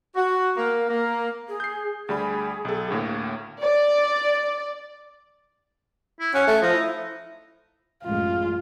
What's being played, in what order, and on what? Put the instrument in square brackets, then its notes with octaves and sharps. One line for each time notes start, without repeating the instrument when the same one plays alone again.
[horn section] F#4
A#3
A#3
[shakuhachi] G#4
[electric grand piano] G6 C7
[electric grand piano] D2 G3 B5 [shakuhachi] G#4
[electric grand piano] B1 A4
D2 A2 A#3
[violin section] D5
[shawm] E4
[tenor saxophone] C#4 [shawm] F#5
[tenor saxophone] A3
[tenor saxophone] F3 [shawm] D#4
[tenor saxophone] E4
[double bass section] A1 F#2 G#3 [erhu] F4